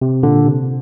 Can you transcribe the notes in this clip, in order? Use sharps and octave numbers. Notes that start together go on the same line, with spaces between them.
C3
A#2 D3
C3